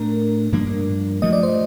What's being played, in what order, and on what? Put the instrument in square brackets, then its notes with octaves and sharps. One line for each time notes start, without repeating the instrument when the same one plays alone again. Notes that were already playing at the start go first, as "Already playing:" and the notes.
Already playing: [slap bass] A2 A3 D4 [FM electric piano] A#4
[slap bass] G2 F3 A#3 D4
[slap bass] G2 F3 A3 [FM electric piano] D#5
[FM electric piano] D5
C5